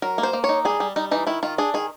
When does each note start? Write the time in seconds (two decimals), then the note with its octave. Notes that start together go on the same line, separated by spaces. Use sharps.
0.02 F#3 A#4
0.18 A#3
0.23 C5
0.33 A#3
0.44 C#5
0.49 D#4
0.65 G3 G#4
0.80 G3
0.96 G3 D#4
1.11 E3 D#4
1.27 D#3 E4
1.43 D#3 F4
1.58 D4 G#4
1.74 D#3 G#4